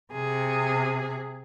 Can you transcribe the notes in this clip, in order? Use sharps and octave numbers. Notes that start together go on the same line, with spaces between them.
C3 G#4